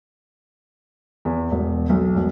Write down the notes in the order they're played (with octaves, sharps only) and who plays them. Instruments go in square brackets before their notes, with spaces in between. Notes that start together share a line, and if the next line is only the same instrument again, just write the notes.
[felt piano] E2
E1
B1
E1